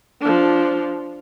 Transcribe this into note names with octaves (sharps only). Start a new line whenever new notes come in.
F3 D4